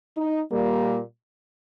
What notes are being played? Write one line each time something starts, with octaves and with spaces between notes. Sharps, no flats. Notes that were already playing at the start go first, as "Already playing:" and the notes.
D#4
A#2 G3 A#3 A#4